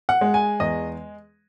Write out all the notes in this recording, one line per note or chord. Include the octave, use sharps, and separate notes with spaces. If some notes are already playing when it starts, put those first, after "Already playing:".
F#5
G#3
G#5
E2 D#5